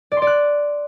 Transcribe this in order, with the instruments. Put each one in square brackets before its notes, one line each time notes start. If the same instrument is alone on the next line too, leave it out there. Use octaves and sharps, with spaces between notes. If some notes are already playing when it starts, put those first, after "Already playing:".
[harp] D5
C6
D5
F#6